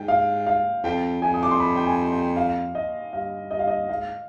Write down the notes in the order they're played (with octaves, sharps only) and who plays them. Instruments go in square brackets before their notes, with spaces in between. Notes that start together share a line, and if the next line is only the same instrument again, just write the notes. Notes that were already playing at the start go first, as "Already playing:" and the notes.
Already playing: [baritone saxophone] G#2 [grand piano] G5
[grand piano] F5
F5
[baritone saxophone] F2 [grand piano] G5
[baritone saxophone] F2 [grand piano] G#5
[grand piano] D#6
D6
C6
B5
G5
G#5
G5
F5
D#5
[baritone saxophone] G2 [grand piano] F5
[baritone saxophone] G2 [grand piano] D#5
[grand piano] F5
D#5
[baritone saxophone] G#2 [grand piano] F5